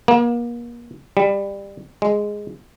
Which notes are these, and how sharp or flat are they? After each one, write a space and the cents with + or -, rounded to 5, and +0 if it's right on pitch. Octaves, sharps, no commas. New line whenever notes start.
A#3 +35
G3 +20
G#3 +0